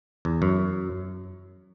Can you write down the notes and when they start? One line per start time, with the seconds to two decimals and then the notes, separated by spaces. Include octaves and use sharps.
0.25 E2
0.42 F#2